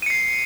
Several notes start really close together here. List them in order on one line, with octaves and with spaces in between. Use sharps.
D#7 C#7 C7